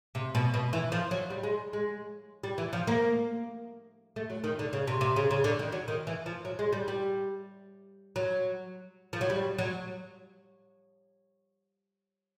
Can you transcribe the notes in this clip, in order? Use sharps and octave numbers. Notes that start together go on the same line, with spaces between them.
C3
B2
B2
E3
F3
F#3
G3
G#3
G#3
G3
E3
F3
A#3
A3
F#3
D#3
D3
C#3
C3
C3
C#3
C#3
D3
D#3
F#3
D#3
E3
F3
F#3
G#3
G3
G3
F#3
F3
F#3
G3
F#3